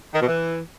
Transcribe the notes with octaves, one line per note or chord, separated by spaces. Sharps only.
D#3
B2
E3